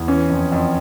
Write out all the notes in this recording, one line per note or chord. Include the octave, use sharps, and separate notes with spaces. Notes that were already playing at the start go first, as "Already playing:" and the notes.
Already playing: E2
E3 C#4
F2
F2